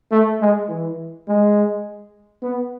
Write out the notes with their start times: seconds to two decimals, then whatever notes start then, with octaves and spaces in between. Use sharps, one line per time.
0.11 A3
0.41 G#3
0.69 E3
1.28 G#3
2.42 B3